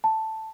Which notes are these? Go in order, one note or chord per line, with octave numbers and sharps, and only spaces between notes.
A5